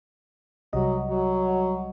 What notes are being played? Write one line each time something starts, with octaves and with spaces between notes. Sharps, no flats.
C2 F#3 G3 D#5
F#3